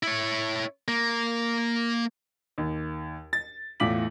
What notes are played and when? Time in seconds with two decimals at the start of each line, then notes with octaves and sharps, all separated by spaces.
0.03 E4 C#5
0.88 A#3
2.58 D#2
3.33 A6
3.80 E2 A2 F4 D6 B6 F#7